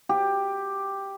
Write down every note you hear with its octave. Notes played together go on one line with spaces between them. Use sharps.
G4